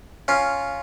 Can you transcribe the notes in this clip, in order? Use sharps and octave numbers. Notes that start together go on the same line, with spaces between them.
C#4 F4